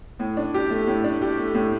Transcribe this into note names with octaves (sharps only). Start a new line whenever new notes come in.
A2
D4
G4
A3
A2
D4
G4
A3
A2